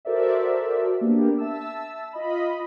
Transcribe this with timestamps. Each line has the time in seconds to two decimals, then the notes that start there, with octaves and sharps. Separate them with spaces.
0.05 F#4 A4 A#4 C5 D5 E5
1.01 A#3 B3 D4 G4
1.38 E5 A5 E6
2.13 F4 D#5 B5